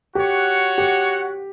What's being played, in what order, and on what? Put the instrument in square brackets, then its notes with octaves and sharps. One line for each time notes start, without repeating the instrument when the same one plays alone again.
[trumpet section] F#4 C#5 F#5 [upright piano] G4
[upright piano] G4